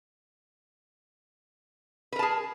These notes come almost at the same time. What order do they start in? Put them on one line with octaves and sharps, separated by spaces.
B4 A#4 A5 G#4